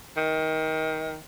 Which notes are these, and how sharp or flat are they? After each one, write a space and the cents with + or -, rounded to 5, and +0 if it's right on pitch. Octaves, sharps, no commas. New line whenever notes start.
D#3 +25